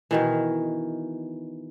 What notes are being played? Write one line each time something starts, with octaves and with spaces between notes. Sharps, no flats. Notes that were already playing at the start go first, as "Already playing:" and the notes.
B2 D#3 E3